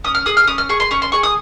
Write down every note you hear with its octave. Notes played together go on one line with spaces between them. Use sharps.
C#4 D#6
F6
G#4 D#6
F6
C#4 D#6
F6
G#4 C#6
C6
C#4 C#6
C6
G#4 C#6
D#6